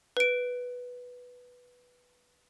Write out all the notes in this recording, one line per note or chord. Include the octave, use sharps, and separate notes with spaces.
B4 D7